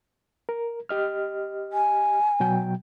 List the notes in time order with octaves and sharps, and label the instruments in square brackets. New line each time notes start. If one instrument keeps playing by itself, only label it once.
[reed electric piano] A#4
G4 D#5 F6
[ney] G#5
[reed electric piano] B2 F#3 G5